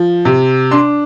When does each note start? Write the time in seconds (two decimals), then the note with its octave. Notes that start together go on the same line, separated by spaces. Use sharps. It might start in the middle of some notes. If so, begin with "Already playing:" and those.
Already playing: F3
0.25 C3
0.71 D4 C6